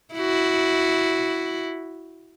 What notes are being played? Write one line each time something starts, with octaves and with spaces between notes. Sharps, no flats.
E4 F#4